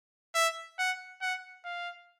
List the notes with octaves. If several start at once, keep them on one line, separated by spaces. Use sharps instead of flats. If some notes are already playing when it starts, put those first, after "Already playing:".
E5
F#5
F#5
F5